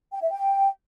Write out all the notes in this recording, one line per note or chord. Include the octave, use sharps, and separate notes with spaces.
G5
E5
G5